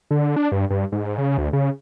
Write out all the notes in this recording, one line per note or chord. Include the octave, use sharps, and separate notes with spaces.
D3
D4
G2
G2
G#2
C#3
D2
C#3